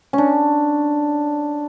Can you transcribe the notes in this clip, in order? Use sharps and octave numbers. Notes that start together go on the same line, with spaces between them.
C#4
D4